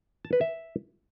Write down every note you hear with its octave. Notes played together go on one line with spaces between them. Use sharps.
A5
B4
E5